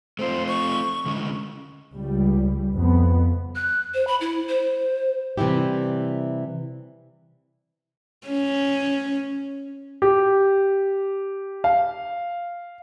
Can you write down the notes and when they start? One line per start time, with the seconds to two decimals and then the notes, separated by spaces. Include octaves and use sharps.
0.19 A3 C4 F4 C5
0.48 C#6
1.06 D3 G#3 C#4
1.93 C#2 G3
2.74 F2 B3
3.55 F#6
3.94 C5
4.07 B5
4.21 E4
4.49 C5
5.38 C3 E3 G3 E4 G4
8.28 C#4
10.02 G4
11.64 F5